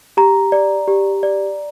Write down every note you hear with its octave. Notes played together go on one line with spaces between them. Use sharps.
G4 A#5
D5
G4
D5